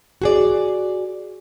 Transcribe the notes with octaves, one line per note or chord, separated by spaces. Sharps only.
F#4 G#4 D5